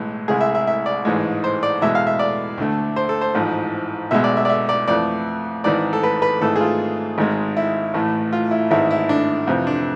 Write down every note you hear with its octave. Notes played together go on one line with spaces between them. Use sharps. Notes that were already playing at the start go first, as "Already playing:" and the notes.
Already playing: B1 A2 E3 G#3
C2 C3 G#3 G#4
E5
E5
E5
D5
A1 G#2 E3 G#3
C5
D5
E2 B2 G#3 E5
F5
E5
D5
D2 D3 A3
C5
A4
C5
A1 G#2 F3
B1 B2 G#3 E5
D5
E5
D5
E5
D5
F2 E3 A3 D5
G#1 G#2 E3 D5
A4
B4
B4
G#1 G#2 E3 A3 A4
G#4
F4
G#1 G#2 G#3
E4
A1 A2 E3 A3
F4
E4
G#1 G#2 E3 E4
E4
D4
F2 C3 E3
D4